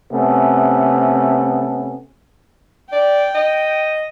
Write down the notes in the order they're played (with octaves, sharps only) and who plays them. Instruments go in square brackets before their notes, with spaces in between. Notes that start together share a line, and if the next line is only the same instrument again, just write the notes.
[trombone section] C3 A3 B3 C#4
[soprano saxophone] D5 [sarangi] G5
[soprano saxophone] D#5